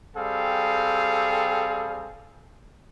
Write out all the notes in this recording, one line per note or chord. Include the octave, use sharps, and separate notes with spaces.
G3 C4 G#4 A4 F5